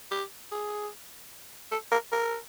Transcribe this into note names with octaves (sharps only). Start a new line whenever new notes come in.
G4
G#4
A4
A#4
A#4